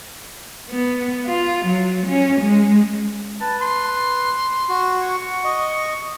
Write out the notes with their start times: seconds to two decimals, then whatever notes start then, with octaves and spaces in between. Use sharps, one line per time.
0.70 B3
1.26 F4
1.65 F#3
2.07 C#4
2.41 G#3
3.40 B4 A5
3.62 C6
4.69 F#4
5.02 C#6
5.45 D#5